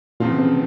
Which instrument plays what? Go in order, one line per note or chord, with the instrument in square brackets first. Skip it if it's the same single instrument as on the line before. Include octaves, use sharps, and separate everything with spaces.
[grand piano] E2 C#3 F3 C4 F4 [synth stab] A#2
[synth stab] C3